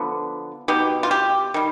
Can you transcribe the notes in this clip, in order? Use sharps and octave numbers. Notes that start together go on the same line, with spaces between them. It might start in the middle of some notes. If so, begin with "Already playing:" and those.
Already playing: D3 F3 B3
B2 B3 D#4 G4
F4
G4
D#3 G3